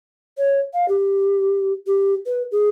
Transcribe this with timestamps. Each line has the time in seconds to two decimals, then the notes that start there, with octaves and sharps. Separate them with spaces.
0.38 C#5
0.73 F5
0.89 G4
1.87 G4
2.26 B4
2.51 G#4